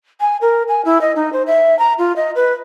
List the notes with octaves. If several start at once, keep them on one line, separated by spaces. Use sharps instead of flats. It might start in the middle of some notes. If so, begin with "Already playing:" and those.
G#5
A#4
G#5
E4
D#5
D#4
C5
E5
A#5
F4
D#5
B4